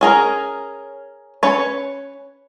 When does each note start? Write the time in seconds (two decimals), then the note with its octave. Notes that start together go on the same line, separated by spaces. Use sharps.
0.01 C#4 G#4 A#4
1.43 C#4 B4 C#5